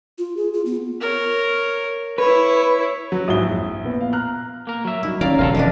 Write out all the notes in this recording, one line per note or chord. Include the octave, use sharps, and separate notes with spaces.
F4
G#4
F4
B3
A#4 C#5
E4 B4 C#5
F#3 F#4
A#1 G#2 F#3 E4 D#6 G7
F2
A#2 B3
F5
A#5 F6 F#6
A#3 A#4
F#3 E5
G3 D#4 E4
D#3 F#3 C#4 A#4 D5 F5
E1 E2 D3 A4 D#5 F5
F2 D#3 F3 D4